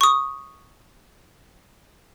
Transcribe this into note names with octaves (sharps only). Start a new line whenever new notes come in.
C#6 D#6